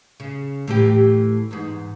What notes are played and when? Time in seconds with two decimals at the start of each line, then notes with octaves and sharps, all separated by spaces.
0.20 C#3
0.68 A2 E3 G4
1.51 E2 G#2